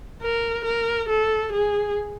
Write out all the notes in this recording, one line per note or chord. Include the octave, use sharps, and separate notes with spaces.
A#4
A#4
A4
G#4